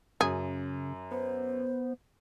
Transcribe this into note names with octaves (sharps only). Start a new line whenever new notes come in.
F#2 C#3 G#4
B3 C5